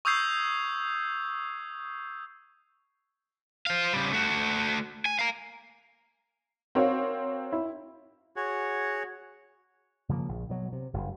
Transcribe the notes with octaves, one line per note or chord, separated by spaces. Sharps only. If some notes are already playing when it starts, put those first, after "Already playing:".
C#6 D#6 E6 G6 G#6 C7
C5 F5
C#3 G3
A3 F#4
G#5
F5 A#5
C4 F#4 A#4 C#5 F5
E4
F#4 G#4 C#5 F#5
C#3 F3 G3 A#3
A#1
B2 F#3
C3
F#1 G2